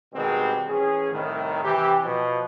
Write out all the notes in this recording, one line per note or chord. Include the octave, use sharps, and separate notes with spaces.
B2 D#3 G3 G#3 C4
A1 C#4 G#4
C2 A2 D#3
C3 E3 G4
B2 F3